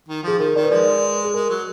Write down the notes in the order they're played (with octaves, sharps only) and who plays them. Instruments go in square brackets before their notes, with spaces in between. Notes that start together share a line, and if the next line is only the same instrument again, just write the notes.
[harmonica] D#3
[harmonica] F3 [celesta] G#4
[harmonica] D#3 [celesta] A#4
[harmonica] D#3 [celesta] A#4 D5
[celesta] B4
[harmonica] F3 G#3 [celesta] A#4 D5
[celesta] G#4
[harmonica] G#3 [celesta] A#4
[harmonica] F#3